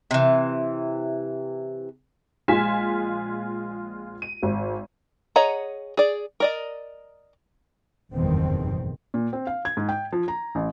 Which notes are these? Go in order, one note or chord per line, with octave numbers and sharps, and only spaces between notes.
C3 E3
A#1 G#3 F4 G#5 B6 E7
D#7
G#1
G#4 C#5 D#5 F#5 A#5
G#4 D5
A#4 D5 D#5
F#1 E2 G2 B2 D#3 C4
A#2
C4
F5
G#6
G#2
G5
F3
A#5
A1